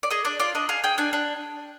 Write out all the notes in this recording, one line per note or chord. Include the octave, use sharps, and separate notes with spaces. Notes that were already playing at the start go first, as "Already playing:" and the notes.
D5
G#4 D#5
D4 D5
F4 D5
D4 D#5
G#4 F5
G#4 G5
D4 G#5
D4